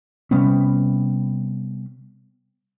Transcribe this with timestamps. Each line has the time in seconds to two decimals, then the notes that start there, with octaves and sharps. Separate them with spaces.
0.31 C3 G3 B3 C#4